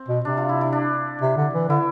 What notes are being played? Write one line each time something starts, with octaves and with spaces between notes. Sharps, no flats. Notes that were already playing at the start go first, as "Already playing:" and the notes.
Already playing: C4
B2
C3 D4
F4
E4
E4
D4
C3
D3
E3
D3 E4